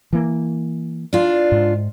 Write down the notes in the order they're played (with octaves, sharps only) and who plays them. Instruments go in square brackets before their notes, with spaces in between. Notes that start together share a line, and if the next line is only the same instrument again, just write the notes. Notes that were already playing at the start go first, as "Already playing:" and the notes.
[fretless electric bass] E3 A#3
[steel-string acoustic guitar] D4 F4
[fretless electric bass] G#2